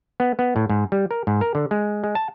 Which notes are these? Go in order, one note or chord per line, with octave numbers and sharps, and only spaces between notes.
B3
B3
A2
G#2
G3
A#4
G#2
A#4
D3
G#3
G#3
A5